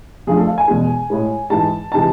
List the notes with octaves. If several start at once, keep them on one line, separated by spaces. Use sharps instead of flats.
F2 D3 F3 A3 G#4
A4
F5
G#5
E2 B2 G#3
A2 G#3
G#2 E3 G#3 A5
C3 E3 G#3 A5